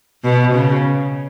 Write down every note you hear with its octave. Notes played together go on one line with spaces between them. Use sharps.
B2
C#3